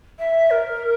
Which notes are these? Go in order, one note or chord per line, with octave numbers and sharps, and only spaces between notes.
E5
A#4